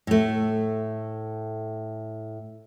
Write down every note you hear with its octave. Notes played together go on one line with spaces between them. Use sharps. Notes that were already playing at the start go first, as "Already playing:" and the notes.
A2 A3